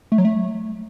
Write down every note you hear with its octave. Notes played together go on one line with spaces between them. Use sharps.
A3
F#3
A3